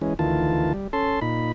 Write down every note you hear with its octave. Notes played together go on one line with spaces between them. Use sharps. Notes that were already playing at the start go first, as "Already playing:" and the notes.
E3 G#3 C#4
D2 D#3 E3 F4 A5
G3
C#4 A4 A5 C6
A#2 D#4 B5